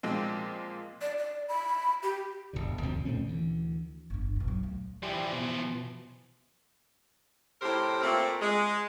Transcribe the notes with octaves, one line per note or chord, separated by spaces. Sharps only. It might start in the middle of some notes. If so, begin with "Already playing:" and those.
A#2 F3 G#3 C4
D5
D5
B5
G4
D1 G1 B2 D3
D2 C3 F3 C4
A#2 A3 C4 C#4
D2 E3
G1 G2
G2 B2
B1 F#3
D2
E3 F3 G4 D5
B2
A2 C3 G4 A#4 C5
A#2 A3 A#3 C4
G#3